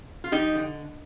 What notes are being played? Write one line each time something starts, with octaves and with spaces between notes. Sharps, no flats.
F4
F3 D#4 G4
D3